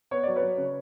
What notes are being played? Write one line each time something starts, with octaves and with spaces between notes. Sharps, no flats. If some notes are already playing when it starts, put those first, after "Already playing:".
B3 C#5
F#3 D5
B4 C#5
F#3
C#3